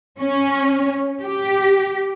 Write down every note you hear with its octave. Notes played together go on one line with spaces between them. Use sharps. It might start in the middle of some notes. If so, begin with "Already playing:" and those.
C#4
G4